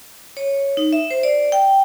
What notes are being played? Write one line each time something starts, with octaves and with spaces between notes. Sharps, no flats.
C#5
D#4
E5
C5
D5
G5